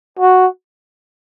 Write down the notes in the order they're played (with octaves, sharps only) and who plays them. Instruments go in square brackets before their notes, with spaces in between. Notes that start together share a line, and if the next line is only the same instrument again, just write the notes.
[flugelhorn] F#4